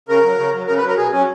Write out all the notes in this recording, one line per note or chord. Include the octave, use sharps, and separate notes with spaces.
C#3 A#4
F#3
C#3
F#3
C#3 A#4
B4
F#3
A#4
B2 G#4
F#3 C#4